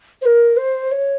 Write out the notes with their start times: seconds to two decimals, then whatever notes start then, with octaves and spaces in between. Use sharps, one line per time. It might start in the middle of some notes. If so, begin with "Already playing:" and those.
0.22 C5
0.25 A#4
0.57 C5
0.92 C#5